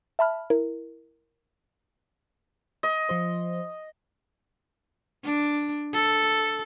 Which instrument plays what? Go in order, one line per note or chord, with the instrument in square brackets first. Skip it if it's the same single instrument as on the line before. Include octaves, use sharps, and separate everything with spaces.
[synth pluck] E5 A5 B5 F6
E4 A#4
[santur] D#5
[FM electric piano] F3 F4 C5
[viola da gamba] D4
A4